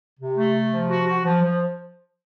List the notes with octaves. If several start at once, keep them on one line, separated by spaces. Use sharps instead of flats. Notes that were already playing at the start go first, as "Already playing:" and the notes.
C3
A3
C3
F3
F#4
F#4
F3
F3